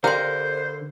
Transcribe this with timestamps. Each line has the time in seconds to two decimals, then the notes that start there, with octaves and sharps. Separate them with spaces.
0.04 D3 G4 A#4 C5 F5 G5 C6